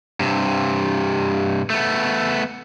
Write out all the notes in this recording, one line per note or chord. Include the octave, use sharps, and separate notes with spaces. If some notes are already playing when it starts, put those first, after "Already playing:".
G2 C3
A3 B3